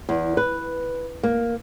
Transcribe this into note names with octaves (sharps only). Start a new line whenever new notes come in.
E2
B4
A#3